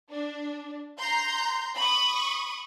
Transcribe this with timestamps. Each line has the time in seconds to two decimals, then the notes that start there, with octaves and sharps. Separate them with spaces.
0.11 D4
0.99 A#5 C6 G6
1.77 B5 C#6 D#6